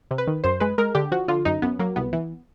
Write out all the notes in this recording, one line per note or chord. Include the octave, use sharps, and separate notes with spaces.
C3
B4
D#3
F#2 C5
G#3 B4
G#3 A#4
D3 G4
F3 F#4
D3 F4
F#2 D#4
F#2 B3
F#3 A#3
C2 B3
E3